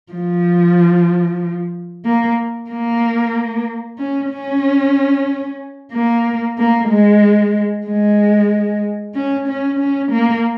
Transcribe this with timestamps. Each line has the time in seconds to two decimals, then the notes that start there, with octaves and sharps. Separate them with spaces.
0.13 F3
2.05 A#3
2.71 A#3
3.99 C#4
4.31 C#4
5.93 A#3
6.58 A#3
6.89 G#3
7.87 G#3
9.15 C#4
9.48 C#4
9.80 C#4
10.12 A#3